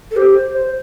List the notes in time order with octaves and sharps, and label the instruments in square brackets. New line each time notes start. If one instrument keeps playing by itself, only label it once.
[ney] A4
[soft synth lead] G4 [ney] C5
[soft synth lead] C5